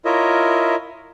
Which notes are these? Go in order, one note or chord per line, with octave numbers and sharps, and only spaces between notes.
E4 F4 A#4 C#5 D#5 E5